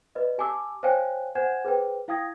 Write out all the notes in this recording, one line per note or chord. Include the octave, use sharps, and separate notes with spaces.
B4 D5 D#5
G4 G#5 A5 D6 E6
C5 C#5 F5 G5 G#5 F#6
C5 F#5 G#5 G6 G#6 E7
G#4 B4 C5 G5
E4 F5 G5 D#6 G#6 A#6